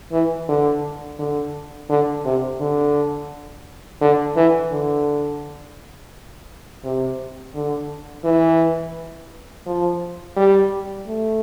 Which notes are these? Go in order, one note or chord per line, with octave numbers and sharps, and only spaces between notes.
E3
D3
D3
D3
C3
D3
D3
E3
D3
C3
D3
E3
F3
G3
A3